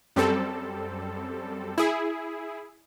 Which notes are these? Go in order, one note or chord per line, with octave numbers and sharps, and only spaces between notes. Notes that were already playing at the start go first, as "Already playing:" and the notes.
F#2 G3 C4 A4
E4 G#4